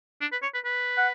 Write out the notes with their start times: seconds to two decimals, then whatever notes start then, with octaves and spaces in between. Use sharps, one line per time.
0.21 D4
0.32 B4
0.43 C#5
0.54 B4
0.65 B4
0.98 F#5